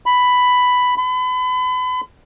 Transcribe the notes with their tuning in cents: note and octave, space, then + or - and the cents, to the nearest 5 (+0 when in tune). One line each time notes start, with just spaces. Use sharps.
B5 +5
B5 +35